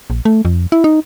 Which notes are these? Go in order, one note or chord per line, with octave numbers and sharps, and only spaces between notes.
A#1
A3
F2
E4
D#4